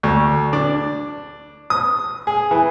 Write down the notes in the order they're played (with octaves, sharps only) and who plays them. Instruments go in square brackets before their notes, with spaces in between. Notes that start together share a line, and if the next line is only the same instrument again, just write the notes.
[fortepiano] D2
D4
D#6
G#4
E3